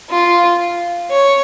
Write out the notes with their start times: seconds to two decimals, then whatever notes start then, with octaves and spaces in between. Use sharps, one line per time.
0.10 F4
1.11 C#5